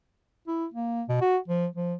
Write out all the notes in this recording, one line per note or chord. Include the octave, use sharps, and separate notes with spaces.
E4
A#3
B2
F#4
F3
F3